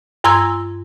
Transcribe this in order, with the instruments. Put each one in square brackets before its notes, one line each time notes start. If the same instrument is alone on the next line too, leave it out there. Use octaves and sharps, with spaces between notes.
[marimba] G2 A#5 C6 E6 G#6